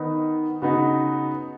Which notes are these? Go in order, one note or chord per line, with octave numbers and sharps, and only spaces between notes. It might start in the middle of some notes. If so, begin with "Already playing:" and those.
Already playing: D#3 B3 D#4
C#3 B3 D#4 F#4